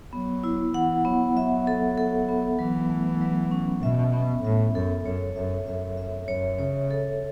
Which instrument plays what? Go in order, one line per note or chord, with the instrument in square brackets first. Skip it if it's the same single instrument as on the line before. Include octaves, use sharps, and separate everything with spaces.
[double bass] F#3 [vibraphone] B3
[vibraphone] E4
[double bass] E3 [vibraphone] F#5
[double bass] F#3 [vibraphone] B3
[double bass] F#3 [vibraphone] E5
[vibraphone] A4
A4
B3
[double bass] E3 [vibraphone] F#3
[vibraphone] A3
F#3
C#4
[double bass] B2 [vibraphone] E5
[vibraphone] B3
[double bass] A2 [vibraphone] E5
[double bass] F#2 [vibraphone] A4
[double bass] F#2 [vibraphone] C#5
[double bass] F#2 [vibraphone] E5
[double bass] F#2 [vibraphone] E5
[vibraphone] E5
[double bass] F#2 [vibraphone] C#5
[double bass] C#3 [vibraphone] C#5
[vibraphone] A4